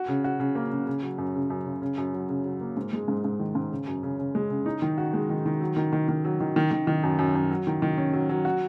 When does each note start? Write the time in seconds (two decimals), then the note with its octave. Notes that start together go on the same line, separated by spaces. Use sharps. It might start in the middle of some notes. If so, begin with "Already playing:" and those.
Already playing: F#4
0.08 C#3
0.24 F#4
0.40 C#3
0.55 A#3
0.71 C#3
0.87 C#3
1.03 F#3
1.18 F#2
1.35 C#3
1.50 F#2
1.66 C#3
1.82 C#3
1.98 F#2
2.14 F#3
2.29 C#3
2.45 F#3
2.61 A#3
2.77 G#2
2.93 G#3
3.08 G#2
3.24 G#2
3.40 D#3
3.55 G#2
3.71 C#3
3.87 F#2
4.03 C#3
4.19 C#3
4.35 G#3
4.50 C#3
4.66 D#4
4.82 D#3
4.98 F#4
5.13 G#3
5.30 D#3
5.46 D#3
5.61 F#3
5.77 D#3
5.93 D#3
6.09 D#3
6.25 F#3
6.41 D#3
6.56 D#3
6.71 D#3
6.87 D#3
7.03 F#2
7.19 F#2
7.35 F#2
7.50 F#3
7.67 D#3
7.82 D#3
7.98 C#4
8.13 F#3
8.29 F#3
8.45 F#4